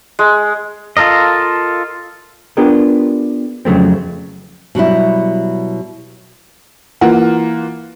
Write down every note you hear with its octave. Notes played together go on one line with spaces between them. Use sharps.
G#3
F4 A4 A#4 D#5
B3 D4 F4 G4 G#4 A#4
F2 C#3 F#3 A3 C4
B2 F#3 G3 E4
E3 A#3 F4 F#5